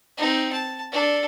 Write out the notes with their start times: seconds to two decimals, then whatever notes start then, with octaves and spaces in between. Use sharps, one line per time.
0.17 C4 D#4
0.52 A5
0.92 D4 A4